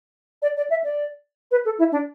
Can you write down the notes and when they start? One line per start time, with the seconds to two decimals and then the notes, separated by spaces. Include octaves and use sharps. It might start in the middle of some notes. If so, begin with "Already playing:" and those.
0.42 D5
0.56 D5
0.70 E5
0.83 D5
1.51 B4
1.64 A4
1.78 E4
1.91 D4